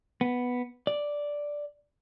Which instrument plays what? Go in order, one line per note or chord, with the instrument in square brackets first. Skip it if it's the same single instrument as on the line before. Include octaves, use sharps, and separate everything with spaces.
[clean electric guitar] B3
D5